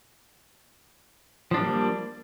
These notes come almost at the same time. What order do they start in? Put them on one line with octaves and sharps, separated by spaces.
F3 D4 G3 A#3